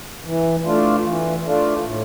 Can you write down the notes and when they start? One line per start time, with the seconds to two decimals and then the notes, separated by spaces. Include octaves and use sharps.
0.25 E3
0.65 A3 D4 F4
1.03 E3
1.43 A3 D4 F4
1.83 A2